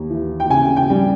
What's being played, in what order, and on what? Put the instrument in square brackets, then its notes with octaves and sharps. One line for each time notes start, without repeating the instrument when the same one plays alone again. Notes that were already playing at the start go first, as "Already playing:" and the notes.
Already playing: [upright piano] D#2
E3
G5
C#3 G#5
G5
G3